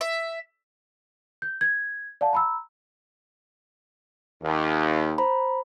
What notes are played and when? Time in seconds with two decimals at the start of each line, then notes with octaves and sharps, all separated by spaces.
0.01 E5
1.42 G6
1.61 G#6
2.21 D5 F5 F#5 A5
2.33 A#5 B5 E6
4.43 D#2
5.18 C5 A#5 B5